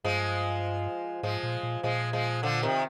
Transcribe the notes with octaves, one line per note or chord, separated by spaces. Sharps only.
G2 F3 G#3
G#2 F3 G#3
A#2
A#2
A#2 F3 G#3
F3 G#3
D3 F3
C3 D#3